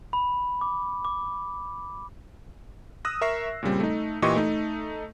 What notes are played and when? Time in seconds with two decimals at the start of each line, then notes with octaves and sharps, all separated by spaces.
0.13 B5
0.61 D6
1.05 D6
3.05 D#6 E6 F#6 A#6
3.21 A#4 E5 C#6 A#6 C7
3.63 A#2 C#3 G3 C4
3.80 A3 D#4
4.22 A#2 E3 G4 D#5 C6 C#6
4.36 A3 D#4